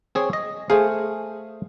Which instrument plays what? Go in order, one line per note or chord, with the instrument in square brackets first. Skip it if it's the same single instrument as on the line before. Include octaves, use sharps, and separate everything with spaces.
[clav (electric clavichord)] C4 G#4 C#5
D#5
[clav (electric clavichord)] A3 C5 F5 [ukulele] G#4